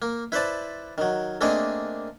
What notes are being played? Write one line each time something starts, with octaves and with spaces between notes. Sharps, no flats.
A#3
E4 B4 C5 D5 A5
D#3 F#3
A3 A#3 C4 D4 G#4 D#5